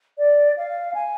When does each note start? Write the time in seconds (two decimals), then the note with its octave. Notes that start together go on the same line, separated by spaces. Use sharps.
0.18 D5
0.57 F5
0.94 G#5